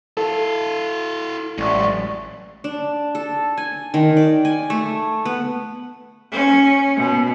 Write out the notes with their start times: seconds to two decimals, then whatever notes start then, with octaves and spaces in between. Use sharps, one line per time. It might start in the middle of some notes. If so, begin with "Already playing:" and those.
0.17 E4 A4 F5
1.58 A1 F#3 G#3 D5 E5 C#6
2.64 D4
3.15 A4
3.58 G#5
3.94 D#3
4.17 D5
4.45 G#5
4.70 A3
5.25 B3
6.32 C#4
6.97 B2